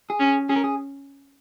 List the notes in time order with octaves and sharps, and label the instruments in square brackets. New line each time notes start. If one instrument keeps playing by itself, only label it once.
[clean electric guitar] G#4
[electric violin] C#4
[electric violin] C#4 [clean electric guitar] G#4
[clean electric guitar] A#4
G#4